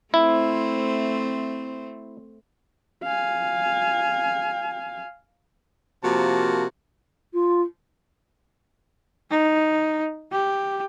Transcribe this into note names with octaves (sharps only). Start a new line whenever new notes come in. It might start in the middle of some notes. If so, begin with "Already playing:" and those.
A3 C4 E4 C5
F5 G#5
C3 F3 A#3 F#4 A#4 A5
F4
D#4
G4